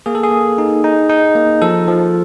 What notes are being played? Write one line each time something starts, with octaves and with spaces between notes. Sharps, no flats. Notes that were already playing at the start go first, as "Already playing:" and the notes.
A#3 G#4
A4
G#4
A#3
D#4
D#4
D#4
A#3
F3 A4
F3